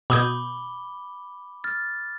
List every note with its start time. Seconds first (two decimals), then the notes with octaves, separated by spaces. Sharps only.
0.10 B2 B5 D6 D#6 G6 G7
1.64 F6 A6